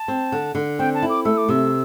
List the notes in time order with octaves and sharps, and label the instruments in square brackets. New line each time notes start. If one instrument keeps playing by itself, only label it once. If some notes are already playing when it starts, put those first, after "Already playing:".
Already playing: [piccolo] A5
[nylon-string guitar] C4
D3
D3
[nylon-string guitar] C4 [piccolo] G5
[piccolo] A5
[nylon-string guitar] E4
[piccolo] D6
[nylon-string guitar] A3 [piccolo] E6
[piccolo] D6
[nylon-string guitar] C3 [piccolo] E6